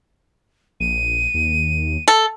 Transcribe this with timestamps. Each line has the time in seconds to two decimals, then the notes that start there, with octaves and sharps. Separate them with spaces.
0.80 A#1 D#7
1.34 D#2
2.08 A4